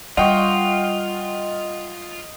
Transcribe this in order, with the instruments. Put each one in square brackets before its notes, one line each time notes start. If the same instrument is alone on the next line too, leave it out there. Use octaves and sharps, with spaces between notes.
[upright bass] G3 [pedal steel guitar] F4 [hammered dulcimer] D#5 [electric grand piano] F#5 G5 C#6